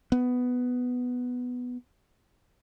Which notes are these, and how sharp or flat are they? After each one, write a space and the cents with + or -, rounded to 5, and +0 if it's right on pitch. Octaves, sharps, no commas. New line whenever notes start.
B3 +5